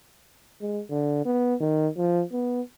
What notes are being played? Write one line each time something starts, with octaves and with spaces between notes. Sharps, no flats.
G#3
D3
B3
D#3
F3
B3